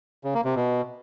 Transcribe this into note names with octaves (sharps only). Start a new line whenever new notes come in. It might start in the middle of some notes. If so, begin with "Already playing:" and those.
C#3
A#3
C3
B2